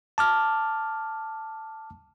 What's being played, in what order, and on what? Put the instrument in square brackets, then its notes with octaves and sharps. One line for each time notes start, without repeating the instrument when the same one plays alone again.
[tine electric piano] A5 D6 F6